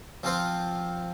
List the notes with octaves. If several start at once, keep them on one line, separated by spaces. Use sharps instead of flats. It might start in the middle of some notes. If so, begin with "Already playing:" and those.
F3 C4 F4 C5